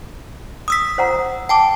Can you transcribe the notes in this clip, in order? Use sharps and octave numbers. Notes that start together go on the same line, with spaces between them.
D#6 E6 B6
C5 F#5 A#5
G5 A5 D6